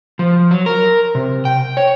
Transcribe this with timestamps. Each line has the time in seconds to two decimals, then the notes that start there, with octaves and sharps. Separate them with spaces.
0.19 F3
0.51 F#3
0.66 A#4
1.15 C3
1.45 G5
1.77 C#5